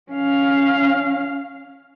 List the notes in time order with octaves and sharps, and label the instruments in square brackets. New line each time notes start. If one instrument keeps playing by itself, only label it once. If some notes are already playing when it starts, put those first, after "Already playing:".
[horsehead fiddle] C#4 F5